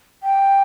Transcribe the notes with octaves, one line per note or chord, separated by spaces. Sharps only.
G5